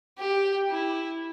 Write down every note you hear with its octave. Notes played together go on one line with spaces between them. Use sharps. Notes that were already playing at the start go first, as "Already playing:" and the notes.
G4
E4